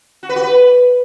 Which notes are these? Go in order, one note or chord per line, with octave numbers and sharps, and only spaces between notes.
F#4
B4
F#4
B4